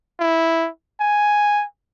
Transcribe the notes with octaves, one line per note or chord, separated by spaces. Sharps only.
E4
G#5